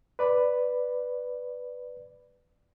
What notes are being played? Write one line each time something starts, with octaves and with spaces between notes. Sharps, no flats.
B4 D5 B5